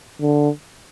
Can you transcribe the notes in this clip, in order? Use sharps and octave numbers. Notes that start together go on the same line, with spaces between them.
D3